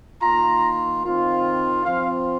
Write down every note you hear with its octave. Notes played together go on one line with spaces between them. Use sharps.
D#3 A#3 F4 A#5
D#3 C4 F4
F3 C4 F4 F5